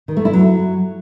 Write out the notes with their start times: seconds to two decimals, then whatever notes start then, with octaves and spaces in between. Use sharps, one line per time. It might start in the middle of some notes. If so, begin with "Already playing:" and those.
0.08 D#3
0.17 A3
0.25 E4
0.33 F#3